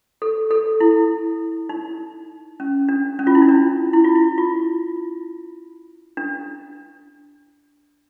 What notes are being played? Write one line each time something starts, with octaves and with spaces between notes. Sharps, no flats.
A4
A4
E4
D#4
C#4
D4
C#4
F4
E4
D#4
D4
E4
F4
E4
F4
D4